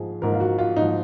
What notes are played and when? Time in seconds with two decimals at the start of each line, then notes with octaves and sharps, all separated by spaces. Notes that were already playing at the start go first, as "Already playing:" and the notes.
Already playing: G#2 F3 G#4
0.22 G#2 F3 A#4
0.34 F4
0.40 F#4
0.59 F4
0.77 G#2 F3 D#4